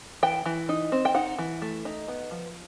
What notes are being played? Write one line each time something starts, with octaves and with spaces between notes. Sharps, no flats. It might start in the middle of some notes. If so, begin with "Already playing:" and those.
E3 G5
E3
D#4
C4
G5
D#4 F#5
E3
A3
D#4
B3
F3